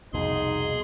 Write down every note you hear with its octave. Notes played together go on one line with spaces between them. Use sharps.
C2 F2 B2 D#4 G#4 C6